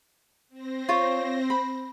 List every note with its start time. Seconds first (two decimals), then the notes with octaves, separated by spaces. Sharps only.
0.49 C4 C5 A#6
0.89 F4 C#5
1.50 B5